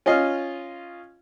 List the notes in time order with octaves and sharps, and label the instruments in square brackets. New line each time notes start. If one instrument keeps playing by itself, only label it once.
[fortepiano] C#4 F4 D#5 F5